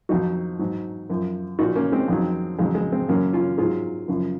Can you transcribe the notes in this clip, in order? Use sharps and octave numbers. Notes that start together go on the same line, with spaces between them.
F2 D#3 F#3 D#4 F#4
G#2 F#3
F#2 F3
A#2 F3 D#4 F#4
A#3 C#4
G#3 C4
F2 D#3 F#3
F2 C#3 F#3 G#3
G#3
G#3 C4
F#2 C#3 F#3 A#3 C#4
C#4 F4
G#2 F#3 F4 G#4
F#2 C#3 F3